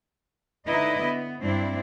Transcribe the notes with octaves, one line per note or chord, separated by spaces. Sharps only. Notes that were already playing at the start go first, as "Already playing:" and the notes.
D3 D#4 E4 B4 D#5
B3
G2 C4 D4 E4